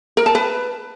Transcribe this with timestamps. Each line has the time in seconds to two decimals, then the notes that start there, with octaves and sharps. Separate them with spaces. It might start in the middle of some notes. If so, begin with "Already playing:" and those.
0.17 A#4
0.26 A5
0.35 B4